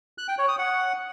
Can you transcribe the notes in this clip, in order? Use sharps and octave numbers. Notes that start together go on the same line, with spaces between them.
F#6
G5
C#5
D#6
F#5